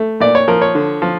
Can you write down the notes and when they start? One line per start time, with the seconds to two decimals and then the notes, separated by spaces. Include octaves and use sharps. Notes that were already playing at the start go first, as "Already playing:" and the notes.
Already playing: A3
0.20 A#2 D5
0.35 C#5
0.48 F3 A#4
0.62 C#5
0.75 D3
1.02 F3